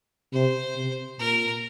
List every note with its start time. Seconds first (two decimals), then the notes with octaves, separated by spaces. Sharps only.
0.33 C3 C5
0.76 C3
1.19 A#2 A#4